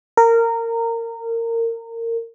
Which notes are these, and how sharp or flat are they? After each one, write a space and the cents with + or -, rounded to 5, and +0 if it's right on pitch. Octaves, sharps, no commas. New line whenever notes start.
A#4 -25